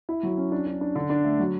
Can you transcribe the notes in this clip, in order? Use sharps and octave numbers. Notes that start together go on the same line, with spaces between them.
E4
F#3
C#4
D4
D4
D4
D3
D4
A3
F#3